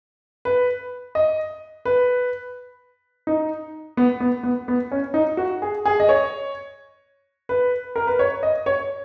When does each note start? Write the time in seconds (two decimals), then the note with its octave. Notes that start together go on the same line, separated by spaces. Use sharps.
0.45 B4
1.15 D#5
1.85 B4
3.27 D#4
3.97 B3
4.20 B3
4.43 B3
4.68 B3
4.92 C#4
5.14 D#4
5.37 F#4
5.62 G#4
5.86 G#4
6.00 D#5
6.09 C#5
7.49 B4
7.96 A#4
8.07 B4
8.19 C#5
8.43 D#5
8.66 C#5